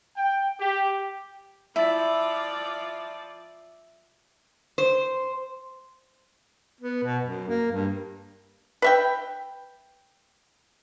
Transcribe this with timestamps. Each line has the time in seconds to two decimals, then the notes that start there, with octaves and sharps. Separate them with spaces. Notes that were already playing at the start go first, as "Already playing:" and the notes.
0.17 G5
0.60 G4
1.76 F3 E4 D5 E5 E6 A6
4.78 C5
6.81 B3
7.03 B2
7.25 F#2
7.48 A#3
7.72 G2
8.82 B4 E5 G5